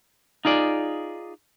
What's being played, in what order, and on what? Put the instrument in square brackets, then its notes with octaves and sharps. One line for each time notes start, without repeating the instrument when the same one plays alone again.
[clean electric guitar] D#4 F4 G#4 D5